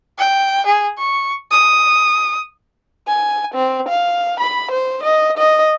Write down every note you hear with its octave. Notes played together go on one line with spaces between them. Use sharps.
G5
G#4
C#6
D#6
G#5
C4
F5
B5
C5
D#5
D#5